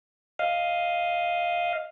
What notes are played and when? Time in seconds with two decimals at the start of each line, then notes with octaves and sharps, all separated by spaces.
0.39 D#5 F5